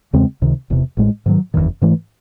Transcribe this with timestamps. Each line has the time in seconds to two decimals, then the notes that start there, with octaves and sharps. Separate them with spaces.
0.13 E2 C#3 G#3 C4
0.42 C#2 C3 D#3
0.70 E1 E2 C3
0.97 A1 A2 G#3
1.26 G#2 D#3 F#3
1.54 F#1 E2 C3 D#3
1.82 G#2 E3 A3